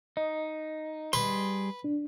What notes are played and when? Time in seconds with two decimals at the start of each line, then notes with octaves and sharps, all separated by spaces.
0.17 D#4 D#5
1.13 G3 G#4 B4 C6
1.84 D4